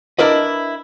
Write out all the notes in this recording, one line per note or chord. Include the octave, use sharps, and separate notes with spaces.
D4 E4 A#4 B4 D#5